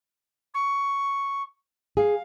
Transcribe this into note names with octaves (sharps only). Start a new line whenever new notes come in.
C#6
G#4 F5